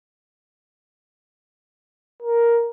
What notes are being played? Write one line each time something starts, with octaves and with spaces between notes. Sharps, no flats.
A#4